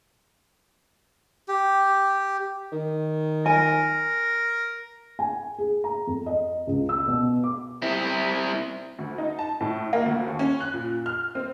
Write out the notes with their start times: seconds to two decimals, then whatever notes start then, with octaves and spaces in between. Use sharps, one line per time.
1.48 G4
2.72 D#3
3.46 A#4 G#5
5.19 G#5
5.58 G#4
5.84 A#5
6.07 F2
6.26 D#5
6.67 C#2
6.89 E6
7.07 B2
7.43 D6
7.82 C4 E4
8.99 D2
9.18 D#4
9.39 A5
9.61 A2
9.93 A#3
10.06 D2
10.27 D#2
10.39 C#4
10.60 F#6
10.74 A#2
11.06 F6
11.35 C4